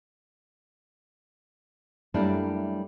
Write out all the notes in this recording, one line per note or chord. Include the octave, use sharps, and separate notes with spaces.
F#2 G3 A3 A#3 D4 E4